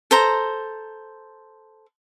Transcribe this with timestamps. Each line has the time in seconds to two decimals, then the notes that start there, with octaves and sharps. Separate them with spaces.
0.11 A4 C5 A#5